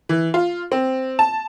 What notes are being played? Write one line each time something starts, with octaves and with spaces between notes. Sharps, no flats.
E3
F4
C4
A5